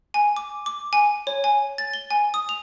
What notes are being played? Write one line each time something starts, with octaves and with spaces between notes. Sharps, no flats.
G#5
D6
D6
G#5
C#5
G#5
A6
G7
G#5
D#6
F7